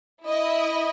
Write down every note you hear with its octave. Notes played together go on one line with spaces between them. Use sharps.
E4 D#5